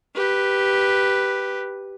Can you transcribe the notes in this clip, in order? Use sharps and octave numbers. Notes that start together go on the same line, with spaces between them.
G4 B4